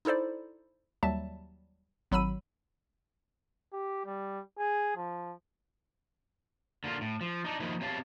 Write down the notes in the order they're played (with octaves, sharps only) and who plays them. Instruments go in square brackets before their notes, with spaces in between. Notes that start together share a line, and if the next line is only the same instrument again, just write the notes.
[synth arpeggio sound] D#4 E4 A4 C5 D5
D#2 F#3 G3 E5 A5
G#1 F#3 B5 E6 D#7
[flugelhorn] G4
G3
G#4
F3
[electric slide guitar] D3 A#3 E4 F4
A2
F3
D4 D#4
D#3 F3 A#3 D#4 E4
C4 G4 C#5 E5 F5 A5